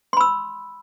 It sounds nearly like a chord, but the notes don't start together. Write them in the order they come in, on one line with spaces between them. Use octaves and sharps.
C6 B5 E6